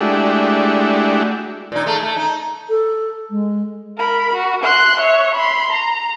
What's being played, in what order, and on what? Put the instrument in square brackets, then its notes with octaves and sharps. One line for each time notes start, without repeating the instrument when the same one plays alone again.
[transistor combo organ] G#3 A3 D4 E4 F#4 G4
[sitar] A#2 D#4
G#3 A3
A3
D#4
[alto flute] A4
G#3
[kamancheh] A#4 B5
F#4
C6 F#6
C#5 E5
B5 C6
A#5